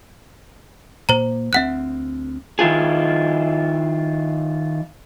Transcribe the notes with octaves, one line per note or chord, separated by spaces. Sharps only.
A#2 C5 A#5
D2 G3 C4 E5 F#5 F#6
D#3 E4 F4 G#4